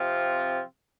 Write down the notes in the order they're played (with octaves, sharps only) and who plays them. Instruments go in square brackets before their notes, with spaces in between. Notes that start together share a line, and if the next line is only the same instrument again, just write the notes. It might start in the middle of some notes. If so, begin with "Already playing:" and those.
Already playing: [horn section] C3 F3 C4 F4